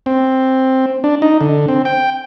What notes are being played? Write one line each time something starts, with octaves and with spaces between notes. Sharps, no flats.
C4
D4
D#4
D3
C4
G5